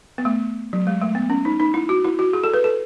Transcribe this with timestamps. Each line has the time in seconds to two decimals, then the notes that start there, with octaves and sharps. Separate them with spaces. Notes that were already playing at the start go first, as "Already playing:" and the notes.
0.18 B3
0.25 A3
0.73 F#3
0.87 G#3
1.01 A3
1.15 B3
1.30 C#4
1.45 D#4
1.60 D#4
1.74 E4
1.89 F#4
2.04 E4
2.19 F#4
2.33 G#4
2.44 A4
2.54 B4
2.64 A4